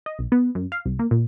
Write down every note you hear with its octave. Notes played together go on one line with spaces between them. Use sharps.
D#5
B1
B3
F#2
F5
C2
A#3
A#2